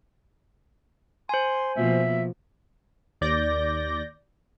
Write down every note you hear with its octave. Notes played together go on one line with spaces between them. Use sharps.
C5 G#5 C6
B2 F3 A#3 E5
D#2 D5 G6 A#6